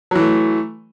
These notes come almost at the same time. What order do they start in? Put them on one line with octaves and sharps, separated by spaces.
F#3 E3 A3